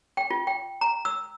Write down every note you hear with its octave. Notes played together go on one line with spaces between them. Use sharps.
G5
F4
G5
A#5
E6